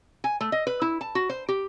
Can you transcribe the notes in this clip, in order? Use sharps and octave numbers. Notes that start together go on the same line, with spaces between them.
G#5
A3
D#5
B4
E4
A5
F#4
C5
G4